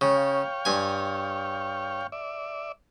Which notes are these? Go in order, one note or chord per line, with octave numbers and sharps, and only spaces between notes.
C#3 C#5 F5 G5
G2 G#5
D5 E5